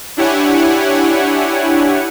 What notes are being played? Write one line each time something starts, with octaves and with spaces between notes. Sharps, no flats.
D4 E4 G4 C#5 F#5 G#5